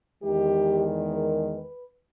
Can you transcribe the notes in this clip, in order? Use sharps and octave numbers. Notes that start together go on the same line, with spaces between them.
E2 D#3 G#3 G4
A#4
B4